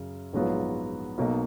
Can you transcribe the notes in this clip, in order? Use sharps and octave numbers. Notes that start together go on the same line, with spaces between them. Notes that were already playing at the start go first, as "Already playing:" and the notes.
Already playing: F#2 C#3
A#1 G#2 F#3 B3 F4
B1 B2 A#3 D#4